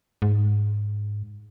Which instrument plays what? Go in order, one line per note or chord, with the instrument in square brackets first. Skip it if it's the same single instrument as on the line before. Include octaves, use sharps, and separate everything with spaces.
[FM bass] G#2